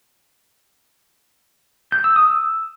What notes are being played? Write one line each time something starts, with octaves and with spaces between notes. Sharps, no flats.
G6
E6
D#6
E6